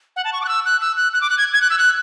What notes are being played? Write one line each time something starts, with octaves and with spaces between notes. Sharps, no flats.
F#5
A5
C#6
D6
F#6
E6
F#6
E6
F#6
F#6
D6
F#6
G#6
G#6
F#6
E6
F#6